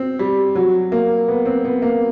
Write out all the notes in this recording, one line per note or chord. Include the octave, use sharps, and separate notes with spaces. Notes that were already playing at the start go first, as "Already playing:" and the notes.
Already playing: C4
G3
F#3
A#3
B3
C4
B3
A#3